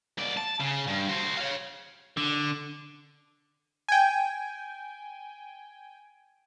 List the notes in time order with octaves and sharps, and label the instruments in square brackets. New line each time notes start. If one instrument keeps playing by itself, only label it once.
[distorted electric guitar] G#2 D5
A5
C#3
G2
F#4 C5
C#5 F5
[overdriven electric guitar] D3
[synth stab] G5 G#5